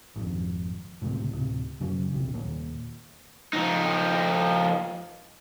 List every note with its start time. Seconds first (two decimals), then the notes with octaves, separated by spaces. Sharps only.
0.16 G#1 F2
1.02 G1 C#2 A2 C3
1.32 D1 C3
1.80 F#2 C#3 F#3
2.12 A#1 E2 C3
2.34 D#2 A#2
3.53 F3 D#4